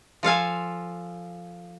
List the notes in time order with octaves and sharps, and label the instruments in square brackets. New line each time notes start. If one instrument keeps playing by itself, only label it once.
[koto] F3 A4 F5 G#5